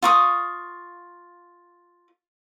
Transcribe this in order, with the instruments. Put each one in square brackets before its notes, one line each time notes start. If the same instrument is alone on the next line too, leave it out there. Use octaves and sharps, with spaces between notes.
[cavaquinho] F4 C#6 D#6